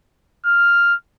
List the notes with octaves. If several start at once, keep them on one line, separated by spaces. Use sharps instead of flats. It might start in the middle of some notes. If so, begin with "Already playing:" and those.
F6